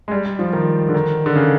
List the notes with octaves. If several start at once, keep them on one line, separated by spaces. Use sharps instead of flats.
G#3
G3
G3
F3
D#3
D3
D#3
D3
C#3